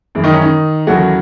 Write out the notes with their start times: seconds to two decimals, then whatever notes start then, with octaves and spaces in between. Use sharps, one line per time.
0.15 F#2 E3 G#3
0.24 D#3 D#4
0.33 C#4
0.42 D#3 D#4
0.87 D#2 C#3 E3 F#3 A3 F#4